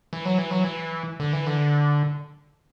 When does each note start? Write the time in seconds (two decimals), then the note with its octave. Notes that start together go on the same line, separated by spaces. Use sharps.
0.13 E3
0.25 F#3
0.38 E3
0.51 F#3
0.64 E3
1.20 D3
1.33 E3
1.46 D3